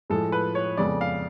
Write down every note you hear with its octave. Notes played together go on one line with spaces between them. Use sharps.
A2 F3 G#3 A4
B4
C#5
F2 C#3 G#3 B3 D5
F5